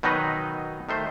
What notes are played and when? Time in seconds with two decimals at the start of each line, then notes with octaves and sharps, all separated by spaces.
0.03 B2 D#3 F#3 D#4 B4 D#5
0.89 D#3 A3 C5